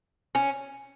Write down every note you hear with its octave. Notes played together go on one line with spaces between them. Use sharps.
C#4